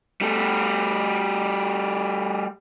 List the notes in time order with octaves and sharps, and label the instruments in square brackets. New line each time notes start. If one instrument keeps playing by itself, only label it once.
[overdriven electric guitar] G3 A3